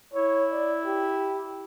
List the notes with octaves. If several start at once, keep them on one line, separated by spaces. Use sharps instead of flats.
E4 C#5
D5
G4